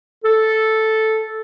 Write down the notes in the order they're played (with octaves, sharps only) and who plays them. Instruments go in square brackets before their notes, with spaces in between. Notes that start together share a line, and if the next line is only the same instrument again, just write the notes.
[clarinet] A4